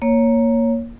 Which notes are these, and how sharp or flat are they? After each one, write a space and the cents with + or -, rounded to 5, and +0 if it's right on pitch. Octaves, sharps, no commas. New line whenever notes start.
A#3 +0 C#5 +0